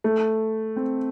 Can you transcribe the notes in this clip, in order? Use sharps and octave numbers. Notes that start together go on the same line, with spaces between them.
A3
C4